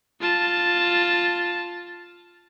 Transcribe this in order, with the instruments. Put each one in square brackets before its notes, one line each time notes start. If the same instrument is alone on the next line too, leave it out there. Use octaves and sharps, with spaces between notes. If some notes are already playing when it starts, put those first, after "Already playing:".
[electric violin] F4 A5